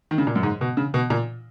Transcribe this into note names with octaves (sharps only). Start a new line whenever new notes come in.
D#3
C#3
A#2
F#2
G#2
B2
C#3
B2
A#2